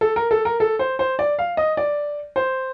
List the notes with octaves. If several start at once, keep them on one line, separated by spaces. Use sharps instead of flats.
A4
A#4
A4
A#4
A4
C5
C5
D5
F5
D#5
D5
C5